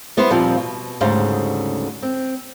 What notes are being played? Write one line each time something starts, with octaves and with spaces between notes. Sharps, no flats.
G3 B3 E4 B4 C5
D#2 A#2 F3 G3 C4 F5
B2
D2 G#2 C#3 G3 C5 F5
C4